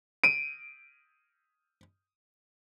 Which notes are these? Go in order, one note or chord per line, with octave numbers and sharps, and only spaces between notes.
D7 D#7